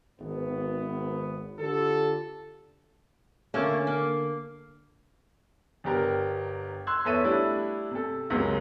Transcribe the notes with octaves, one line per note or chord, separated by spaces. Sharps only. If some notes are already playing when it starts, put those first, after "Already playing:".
G#1 B3
D3 F4 G4 A4
D3 A3 A#3 C#4
A#3
G1 D4 G4 A#4
C6 E6 F#6 G#6
E2 B3 A4 C#5 E5 D#7
G3 A3 D4 E4
C3 A4
C#2 F#2 C3 F#3 G#3 A#3